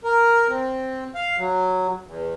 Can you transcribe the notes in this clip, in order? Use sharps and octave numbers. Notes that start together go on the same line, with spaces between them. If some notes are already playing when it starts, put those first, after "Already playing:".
A#4
C4
F5
F#3
E2